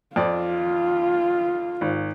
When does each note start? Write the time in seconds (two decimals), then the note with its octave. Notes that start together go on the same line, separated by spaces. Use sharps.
0.16 F2 F4 C5 D5
1.81 G#1